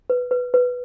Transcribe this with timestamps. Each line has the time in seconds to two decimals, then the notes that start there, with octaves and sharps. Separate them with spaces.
0.10 B4
0.31 B4
0.54 B4